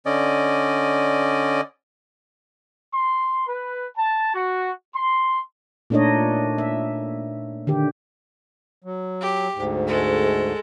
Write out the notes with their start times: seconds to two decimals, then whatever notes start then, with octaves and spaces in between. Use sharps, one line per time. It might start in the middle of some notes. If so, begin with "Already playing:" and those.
0.06 D3 C#4 D5 D#5
2.94 C6
3.47 B4
3.97 A5
4.34 F#4
4.95 C6
5.90 A#2 A3 D4 D#4 C#5 D#5
6.58 E5
7.67 D3 D#3 G4
8.84 F#3
9.21 G4
9.55 D2 G#2
9.87 G#3 A4